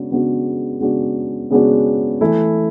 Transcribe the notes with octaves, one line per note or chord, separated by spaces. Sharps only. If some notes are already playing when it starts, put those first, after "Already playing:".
Already playing: C#3 G#3 B3 D4 F#4
C#3 G#3 B3 D4 F#4
C#3 G#3 B3 D4 F#4
C#3 G#3 B3 D4 F#4
E3 A3 E4